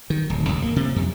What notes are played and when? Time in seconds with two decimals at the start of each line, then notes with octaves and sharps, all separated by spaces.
0.10 D#3
0.30 D1
0.49 C2
0.62 A#3
0.76 C3
0.96 F2